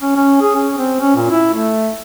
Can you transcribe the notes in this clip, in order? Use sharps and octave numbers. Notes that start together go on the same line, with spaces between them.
C#4
C#4
G#4
C#4
C4
C#4
A#2
E4
A3